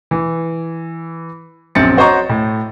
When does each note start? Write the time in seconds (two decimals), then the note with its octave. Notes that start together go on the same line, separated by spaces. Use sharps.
0.11 E3
1.75 A#1 F#2 C4 A6 C#7
1.97 F#4 C5 C#5 D#5 A#5 C#6
2.29 A2